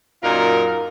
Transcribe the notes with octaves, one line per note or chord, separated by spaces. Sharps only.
F#2 A#2 D#4 F4 A#4